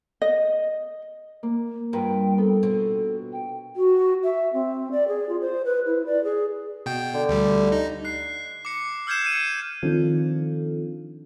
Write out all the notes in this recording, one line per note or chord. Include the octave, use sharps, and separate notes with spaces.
D#5
A#3
G2 F4 A#4 B4 G5
B3 A4
B2 C4
G5
F#4
E5
C4
D5
G#4
F4
C5
B4
E4
D5
G#4
B2 G5
D3
D2 G3
D#4
F#6 C7
D6 C#7
E6 F6 G6 G#6 C7 E7
C#7 D#7
D#3 F3 C4 D4 F4 A4